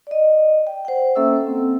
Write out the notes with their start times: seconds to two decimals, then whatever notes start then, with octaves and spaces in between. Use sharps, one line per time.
0.07 D5 D#5
0.67 G5
0.85 C5 F#5 G5
1.15 A#3 C#4 A4 E5 E6
1.46 C4